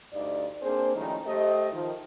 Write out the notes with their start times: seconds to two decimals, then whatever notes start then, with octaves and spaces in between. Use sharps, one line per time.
0.14 D2 G2 D#4 D5
0.62 A#3 C4 D4 G#4 C5
0.96 A2 D#3 F3 G3 C#4 D#4
1.26 A3 G4 C5 D#5
1.73 D#3 F3